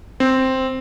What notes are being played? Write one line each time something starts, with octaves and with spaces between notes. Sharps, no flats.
C4